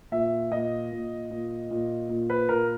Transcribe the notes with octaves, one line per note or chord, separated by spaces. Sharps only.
A#2 E5
A#2 D#5
A#2
A#2
A#2
A#2
B4
A#2 A#4